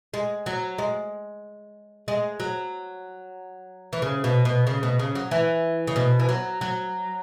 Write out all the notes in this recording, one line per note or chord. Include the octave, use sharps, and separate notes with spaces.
G#3
F#3
G#3
G#3
F#3
E3
C#3
B2
B2
C#3
B2
C#3
F#3
E3
C#3
B2
E3
F#3
F#3